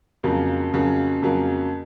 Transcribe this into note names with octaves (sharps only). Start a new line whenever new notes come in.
F2 C#3 F#3 A#3
F2 C#3 F#3 A#3
F2 C#3 F#3 A#3